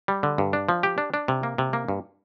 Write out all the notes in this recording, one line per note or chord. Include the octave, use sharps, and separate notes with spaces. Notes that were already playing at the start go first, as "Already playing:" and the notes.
G3
D3
G2
D4
F3
G4
D4
D4
C3
A#3
C3
A#3
G2